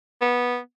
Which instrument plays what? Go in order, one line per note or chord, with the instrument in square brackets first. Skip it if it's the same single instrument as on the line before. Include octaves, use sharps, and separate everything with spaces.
[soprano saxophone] B3